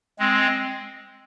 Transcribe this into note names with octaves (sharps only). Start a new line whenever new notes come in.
G#3 C4